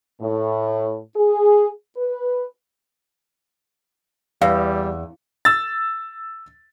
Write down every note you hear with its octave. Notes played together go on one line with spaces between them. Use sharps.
A2
G#4
B4
E2 G3 F5
E6 A6